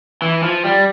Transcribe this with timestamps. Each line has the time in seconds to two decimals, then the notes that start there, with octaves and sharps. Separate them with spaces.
0.22 E3
0.43 F3
0.64 G3